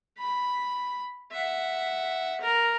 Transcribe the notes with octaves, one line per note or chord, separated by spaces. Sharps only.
B5
E5 F#5
A#4